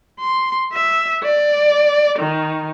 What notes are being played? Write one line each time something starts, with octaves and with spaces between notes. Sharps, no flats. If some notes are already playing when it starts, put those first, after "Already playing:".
C6
E5
D5
D#3